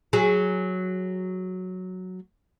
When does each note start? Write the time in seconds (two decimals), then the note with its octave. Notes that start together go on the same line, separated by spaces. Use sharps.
0.13 F#3 G#4